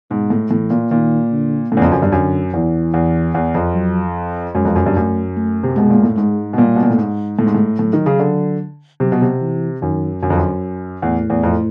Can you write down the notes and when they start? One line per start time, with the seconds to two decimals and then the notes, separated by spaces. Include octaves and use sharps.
0.11 G#2 B2
0.30 A2
0.50 A2 E3
0.70 A#2
0.91 A#2 D#3
1.32 D3
1.71 A2 C#3
1.77 E2
1.82 F2
1.92 F#2
2.02 G2
2.12 F#2 D3
2.53 E2 E3
2.94 E2
3.34 E2
3.55 F2
3.74 F#3
4.55 F#2 G#3
4.65 F2
4.76 F#2
4.86 G2
4.96 F#2 A3
5.36 A3
5.63 C3
5.76 B2 G#3
5.90 A#2
6.03 A2
6.17 G#2 G#3
6.53 B2
6.57 A#2 G3
6.76 B2
6.83 A#2
6.90 A2
6.98 G#2
7.38 A2 G#3
7.46 G#2
7.54 A2
7.79 A2 F#3
7.93 D#3
8.06 C#3
8.19 D3
9.00 C3 F#3
9.12 B2
9.22 C3
9.41 E3
9.82 F#2 D#3
10.22 F#2 D3
10.30 F2
10.37 F#2
11.02 E2 A2
11.30 E2
11.43 F2